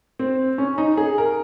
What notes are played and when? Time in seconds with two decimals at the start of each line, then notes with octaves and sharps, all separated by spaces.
0.19 C4
0.58 C#4
0.78 D#4
0.97 G#4
1.18 A#4